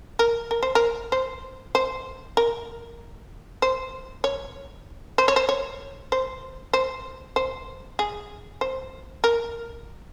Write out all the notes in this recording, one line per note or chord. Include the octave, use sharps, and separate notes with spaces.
A#4
A#4
C5
A#4
C5
C5
A#4
C5
C#5
C5
C#5
C5
C#5
C5
C5
C5
G#4
C5
A#4